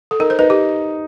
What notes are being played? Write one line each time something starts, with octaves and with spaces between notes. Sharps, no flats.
A4
D#4 A#4
C5
D#4 B4
G4